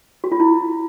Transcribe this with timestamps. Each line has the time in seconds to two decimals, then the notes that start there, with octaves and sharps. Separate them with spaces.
0.24 F#4
0.32 F4
0.40 E4